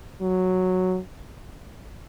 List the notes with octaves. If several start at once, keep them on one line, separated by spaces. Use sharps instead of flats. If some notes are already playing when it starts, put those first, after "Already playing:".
F#3